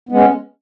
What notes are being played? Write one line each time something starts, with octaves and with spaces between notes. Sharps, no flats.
G#3 B3 C#4